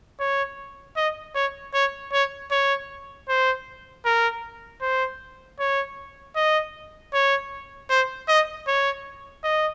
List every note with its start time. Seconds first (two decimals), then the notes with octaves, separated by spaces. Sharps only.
0.20 C#5
0.97 D#5
1.35 C#5
1.74 C#5
2.13 C#5
2.51 C#5
3.28 C5
4.05 A#4
4.81 C5
5.59 C#5
6.36 D#5
7.14 C#5
7.90 C5
8.28 D#5
8.68 C#5
9.44 D#5